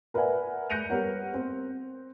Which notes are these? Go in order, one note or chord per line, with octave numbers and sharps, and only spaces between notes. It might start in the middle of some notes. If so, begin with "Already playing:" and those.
A#4 B4 D5 E5 F#5 G#5
F#6 G6 A#6 C#7 D#7 F7
G3 B3 A#4 C#5 F#5
C4